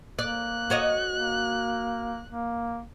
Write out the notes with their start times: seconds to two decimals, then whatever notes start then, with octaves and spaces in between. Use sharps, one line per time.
0.19 A#3 D5 F#6
0.70 F#4 C#5 D#5
1.14 A#3
2.28 A#3